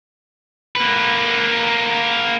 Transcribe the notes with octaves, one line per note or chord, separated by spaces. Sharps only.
A#3 B4